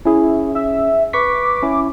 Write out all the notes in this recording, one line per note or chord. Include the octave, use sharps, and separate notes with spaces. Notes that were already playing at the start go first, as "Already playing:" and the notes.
C#4 E4 G#4
E5
B4 C#6 D6 B6
C#4 E4